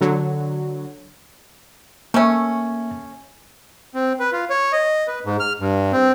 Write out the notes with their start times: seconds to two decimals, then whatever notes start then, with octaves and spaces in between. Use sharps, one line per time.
0.01 D3 F#3
2.14 A3 A#3 C#4 E5
3.95 C4
4.20 B4
4.32 F4
4.50 C#5
4.72 D#5
5.08 B4
5.25 G#2
5.40 F6
5.60 G2
5.92 C4